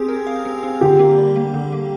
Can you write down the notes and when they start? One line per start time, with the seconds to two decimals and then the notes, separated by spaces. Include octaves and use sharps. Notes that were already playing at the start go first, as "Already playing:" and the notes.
Already playing: C4 G4 G#4
0.08 A#4
0.27 F5
0.45 C4
0.63 C4
0.81 D3 G4
0.99 A#3
1.18 G3
1.36 A#3
1.54 D3
1.72 A#3